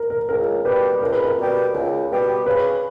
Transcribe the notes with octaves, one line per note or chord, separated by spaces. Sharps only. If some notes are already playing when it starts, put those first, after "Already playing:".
Already playing: A#4
A#4
C#2 A#4
B2 G3 B3 G4 B4
C#2 A#4
B4
A#4
B2 G3 B3 G4
C#2
B2 G3 B3 G4
C#3 B4